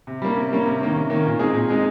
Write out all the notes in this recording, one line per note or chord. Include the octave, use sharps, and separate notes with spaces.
C3
G3 A#3 C#4
C3
G3 A#3 C#4
C3
D#3 A#3 C#4
C3
D#3 A#3 C#4
A#2
G#3 C4 D#4 G#4
A#2
G#3 C4 D#4 G#4